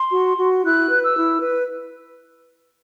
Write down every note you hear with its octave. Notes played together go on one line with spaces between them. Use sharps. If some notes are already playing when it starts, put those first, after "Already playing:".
Already playing: C6
F#4
F#4
E4 F#6
B4
E6
E4
B4